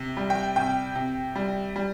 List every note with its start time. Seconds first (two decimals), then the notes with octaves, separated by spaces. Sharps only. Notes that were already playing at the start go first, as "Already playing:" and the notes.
Already playing: C3
0.17 G3
0.30 G5
0.56 C3 G5
0.95 C3
1.36 G3
1.76 G3